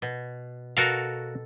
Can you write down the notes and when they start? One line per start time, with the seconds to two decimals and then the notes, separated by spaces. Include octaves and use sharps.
0.02 B2
0.77 B2 F#4 A4 A#4 F5